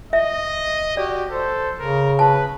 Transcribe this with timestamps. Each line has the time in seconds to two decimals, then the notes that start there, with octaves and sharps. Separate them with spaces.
0.13 D#5 E5
0.97 F#4 G4 D5
1.31 A4 C5
1.80 C#3 A#4
2.19 B4 A5